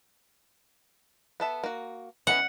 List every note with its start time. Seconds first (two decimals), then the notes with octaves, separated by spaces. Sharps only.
1.40 B3 A4 E5
1.64 A#3 F#4
2.27 E3 B3 C#4 F#5